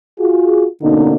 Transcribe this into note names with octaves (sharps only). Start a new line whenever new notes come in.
F4 F#4 G#4
B2 D3 A#3 C#4 D#4